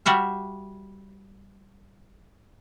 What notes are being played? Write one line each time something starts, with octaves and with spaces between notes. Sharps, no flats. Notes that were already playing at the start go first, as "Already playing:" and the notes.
G3 F#4 E5 F5